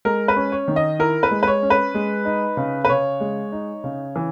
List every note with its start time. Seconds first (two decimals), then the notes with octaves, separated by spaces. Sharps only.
0.05 G#3 A#4
0.28 B4
0.36 C#4
0.52 C#5
0.68 D#3
0.76 D#5
0.99 E4 A#4
1.23 B4
1.31 G#3
1.43 B4
1.47 C#5
1.63 C#4
1.70 B4
1.94 G#3
2.25 D#4
2.57 C#3
2.85 B4
2.89 C#3 C#5
3.20 G#3
3.52 D#4
3.84 C#3
4.16 E3